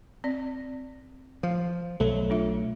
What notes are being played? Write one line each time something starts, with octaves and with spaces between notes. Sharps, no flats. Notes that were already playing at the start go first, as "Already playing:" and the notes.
C4 D5
F3 F5
B1 F#3 A3
D4 F4 E5